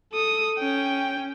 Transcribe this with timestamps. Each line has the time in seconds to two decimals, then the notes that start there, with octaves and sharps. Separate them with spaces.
0.13 A4 D#6
0.58 C#4 G5